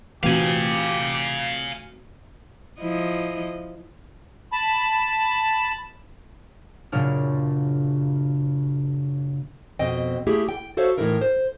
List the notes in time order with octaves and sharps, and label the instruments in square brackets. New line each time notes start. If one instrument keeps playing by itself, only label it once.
[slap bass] A#2 E3 [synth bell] A3 C4 F#4 [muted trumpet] G4 [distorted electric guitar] F5 G#5
[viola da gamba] F3 E4 D#5
[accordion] A5 B5
[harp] F#1 A#2 C#3 D4 F6
[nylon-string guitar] F2 B2 C4 D#5 G5
A3 A#3 E4 G4 G#4
G5
F#4 A4 C5 C#5 E5 F5
A2 E3 A3 D#4 E4 A#4
C5